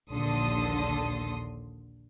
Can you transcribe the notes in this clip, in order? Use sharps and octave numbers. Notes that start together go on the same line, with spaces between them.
A#1 D#2 D3 A4 C6 D#6